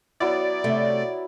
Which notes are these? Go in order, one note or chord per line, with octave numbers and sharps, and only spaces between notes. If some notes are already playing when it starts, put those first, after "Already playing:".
F#3 B3 E4 D5
C3 A3